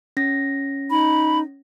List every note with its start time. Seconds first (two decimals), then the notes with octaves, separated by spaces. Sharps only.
0.17 C#4 A#6
0.90 D#4 B5